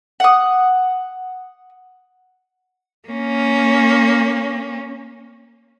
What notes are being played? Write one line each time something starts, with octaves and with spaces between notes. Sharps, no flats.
F#5 D#6
A#3 C#4